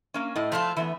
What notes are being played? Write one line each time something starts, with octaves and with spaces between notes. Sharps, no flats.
A#3 C#4
A2 D#5
F3 A3 E4 F4
E3 A3 B3 E5